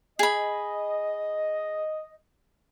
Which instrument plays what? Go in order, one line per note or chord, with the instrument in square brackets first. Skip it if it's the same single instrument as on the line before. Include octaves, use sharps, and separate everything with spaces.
[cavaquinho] G#4 B5 [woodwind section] D#5